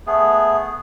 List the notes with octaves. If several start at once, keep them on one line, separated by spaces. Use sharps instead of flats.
A3 B3 G#4